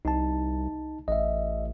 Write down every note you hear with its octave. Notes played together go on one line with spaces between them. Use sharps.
C2 D#4 A5
A1 D#5 E5